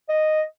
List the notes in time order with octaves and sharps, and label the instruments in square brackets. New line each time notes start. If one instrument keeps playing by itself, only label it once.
[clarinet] D#5